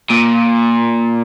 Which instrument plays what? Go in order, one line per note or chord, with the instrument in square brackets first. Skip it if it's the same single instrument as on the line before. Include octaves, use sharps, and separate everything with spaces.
[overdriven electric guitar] A#2